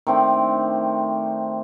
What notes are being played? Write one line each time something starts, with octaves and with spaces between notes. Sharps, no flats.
D#3 A3 C4 D4